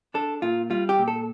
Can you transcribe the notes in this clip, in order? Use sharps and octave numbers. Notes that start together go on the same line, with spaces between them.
D4 A4
A#2 F4
G3 F4
G4
A#2
A4